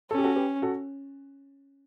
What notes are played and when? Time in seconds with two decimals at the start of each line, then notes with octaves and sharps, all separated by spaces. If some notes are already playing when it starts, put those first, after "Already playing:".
0.11 C#4 A4
0.18 G4
0.24 F#4 A4
0.36 G4 B4
0.62 F#4 A4